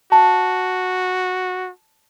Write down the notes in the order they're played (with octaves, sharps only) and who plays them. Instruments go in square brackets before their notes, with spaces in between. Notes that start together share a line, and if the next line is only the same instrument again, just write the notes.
[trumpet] F#4 [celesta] A5